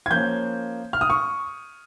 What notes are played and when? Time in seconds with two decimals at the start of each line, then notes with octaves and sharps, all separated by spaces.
0.06 G#6
0.10 F3 A#3 C#4 G6
0.93 F6
1.01 D#6
1.10 C#6